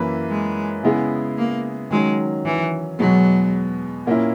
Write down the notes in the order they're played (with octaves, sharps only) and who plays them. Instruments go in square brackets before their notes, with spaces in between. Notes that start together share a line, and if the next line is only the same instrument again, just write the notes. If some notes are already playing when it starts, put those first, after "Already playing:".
Already playing: [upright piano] F#2 E3 A#3 E4 B4
[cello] G#3
[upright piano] C#3 G#3 B3 E4 G#4
[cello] A#3
[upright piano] D#3 F#3 C#4 [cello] G#3
[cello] E3
[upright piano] E2 B2 G#3 B3 [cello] F#3
[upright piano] A#2 A#3 C#4 E4